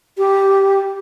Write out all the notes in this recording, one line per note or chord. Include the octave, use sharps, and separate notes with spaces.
G4